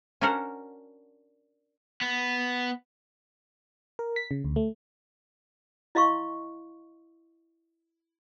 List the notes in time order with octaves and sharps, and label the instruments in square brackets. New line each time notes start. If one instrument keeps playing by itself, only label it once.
[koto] C#4 D4 F#4 A#4 C5 F#5
[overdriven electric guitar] B3
[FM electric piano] A#4
B6
C#3
D2
A3
[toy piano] E4 D#5 F5 C6 C#6